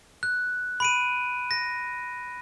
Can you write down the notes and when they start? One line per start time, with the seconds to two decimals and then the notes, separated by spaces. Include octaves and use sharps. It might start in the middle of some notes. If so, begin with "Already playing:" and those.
0.23 F#6
0.80 B5 D7 D#7
1.51 A#6